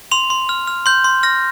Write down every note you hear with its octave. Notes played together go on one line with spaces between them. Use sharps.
C6 F7
C6
F6
F6
C6 G6
C6
F6 A#6